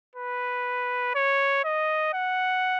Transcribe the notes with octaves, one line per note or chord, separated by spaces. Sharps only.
B4
C#5
D#5
F#5